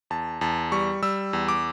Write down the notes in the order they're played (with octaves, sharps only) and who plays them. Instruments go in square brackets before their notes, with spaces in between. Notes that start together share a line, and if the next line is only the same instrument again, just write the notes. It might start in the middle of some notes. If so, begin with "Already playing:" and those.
[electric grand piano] E2 A5
E2 A5
G3 C#6
G3 E6
E2
D6